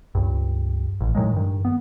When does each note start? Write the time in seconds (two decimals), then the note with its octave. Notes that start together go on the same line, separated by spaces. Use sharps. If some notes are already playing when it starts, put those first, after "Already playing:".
0.15 C#2 G2
1.01 A1
1.15 A2 D#3 F#3 G#3
1.33 G2 D#3
1.65 B3